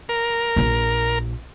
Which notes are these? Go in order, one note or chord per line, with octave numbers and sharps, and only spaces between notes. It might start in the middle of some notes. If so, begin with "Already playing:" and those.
A#4
A#1 F4